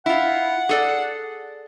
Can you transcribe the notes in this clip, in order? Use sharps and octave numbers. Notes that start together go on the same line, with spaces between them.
E4 F4 F#5
G#4 A4 D5